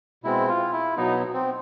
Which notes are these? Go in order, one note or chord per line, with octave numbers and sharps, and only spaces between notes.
B2 G#3 C4 E4
F4
E4
B2 F#3 B3 D#4
C4